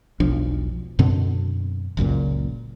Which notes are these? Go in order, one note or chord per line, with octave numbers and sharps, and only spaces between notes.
E1 B1 F3 D4
F#2 B2 D3 C4
F#1 C#2 F#2 A#2